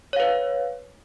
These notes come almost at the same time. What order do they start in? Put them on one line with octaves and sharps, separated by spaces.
C#5 F5 B4